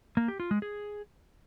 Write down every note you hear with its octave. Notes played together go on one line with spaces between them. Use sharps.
A#3
G4
F4
G#3
G#4